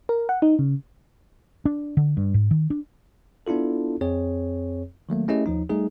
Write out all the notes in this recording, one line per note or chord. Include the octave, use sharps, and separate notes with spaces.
A#4
F#5
D#4
C#3
D4
D3
G2
G#2
D#3
D4
B3 D4 E4 F4 A4
F2 C4 G#4 C#5
D#3 F#3 A3 A#3
A3 C#4 E4 G4 G#4 D#5
D#2 F3 D#4
G3 A3 D#4 G#4